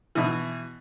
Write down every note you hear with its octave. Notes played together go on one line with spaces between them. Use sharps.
B2 E3